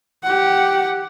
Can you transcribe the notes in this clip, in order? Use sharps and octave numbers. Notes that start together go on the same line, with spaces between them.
G4 F#5